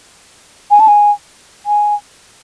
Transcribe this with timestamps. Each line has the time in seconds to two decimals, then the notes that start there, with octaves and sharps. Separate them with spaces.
0.71 G#5
0.80 A5
0.88 G#5
1.66 G#5